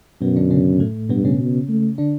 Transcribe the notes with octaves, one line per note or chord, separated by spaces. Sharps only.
F#2 B2 B3
D3 D4
C#3 C#4
A2 A3
G2 B2 B3
C#3 C#4
B2
A3
D3 D4